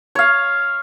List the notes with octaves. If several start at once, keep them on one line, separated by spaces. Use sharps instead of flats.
C#5 F5